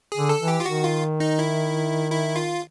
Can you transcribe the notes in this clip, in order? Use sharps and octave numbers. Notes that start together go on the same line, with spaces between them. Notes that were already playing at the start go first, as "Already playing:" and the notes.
G#4
D3
A4
E3
G4
F4
D#3 F#4
F4
D#4
E4
E4
F4